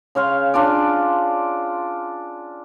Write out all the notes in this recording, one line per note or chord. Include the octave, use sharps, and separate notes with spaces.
C#3 C#5 F5 C6
D4 F4 D5